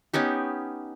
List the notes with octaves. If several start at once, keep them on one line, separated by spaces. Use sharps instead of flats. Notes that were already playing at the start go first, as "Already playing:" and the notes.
B3 C#4 D#4 G4